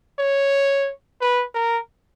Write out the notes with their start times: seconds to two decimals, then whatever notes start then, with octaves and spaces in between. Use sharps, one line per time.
0.19 C#5
1.21 B4
1.55 A#4